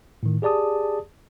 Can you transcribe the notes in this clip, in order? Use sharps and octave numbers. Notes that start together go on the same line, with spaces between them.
A2 D#3
G4 G#4 D5 A5 D#6